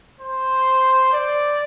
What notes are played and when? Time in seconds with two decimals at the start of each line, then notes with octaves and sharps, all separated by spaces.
0.21 C5
1.13 D5